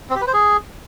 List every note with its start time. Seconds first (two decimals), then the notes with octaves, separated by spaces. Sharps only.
0.10 C4
0.16 G4
0.21 B4
0.27 C5
0.33 G#4